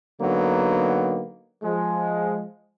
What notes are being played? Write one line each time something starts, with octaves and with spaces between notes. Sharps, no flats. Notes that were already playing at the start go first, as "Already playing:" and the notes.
D3 F#3 A#3 B3 D#4
F3 G#3